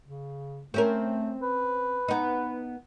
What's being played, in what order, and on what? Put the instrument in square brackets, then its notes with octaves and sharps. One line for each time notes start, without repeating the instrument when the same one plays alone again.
[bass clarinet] C#3
[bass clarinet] A3 [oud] C4 C#4 A#4
[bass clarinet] B4
[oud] B3 D#4